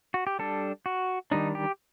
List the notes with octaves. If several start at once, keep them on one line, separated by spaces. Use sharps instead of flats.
F#4
G4
G3 D4 A4
F#4
D#3 G3 D4 D#4
G4